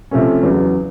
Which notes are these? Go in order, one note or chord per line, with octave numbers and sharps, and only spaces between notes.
C3 F3 A3 C#4
E2 C#3 F#3